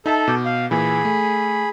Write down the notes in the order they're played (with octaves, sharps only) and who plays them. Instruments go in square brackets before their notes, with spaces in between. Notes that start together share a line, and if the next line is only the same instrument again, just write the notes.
[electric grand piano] D#4 E5 A5 [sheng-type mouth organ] A4
[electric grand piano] B2 D6 G6
[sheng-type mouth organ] F5
[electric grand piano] A#2 E3 [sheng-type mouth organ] G#4 B5
[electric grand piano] A3